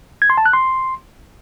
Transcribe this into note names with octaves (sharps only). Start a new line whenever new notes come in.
G#6
C6
A5
F#6
C6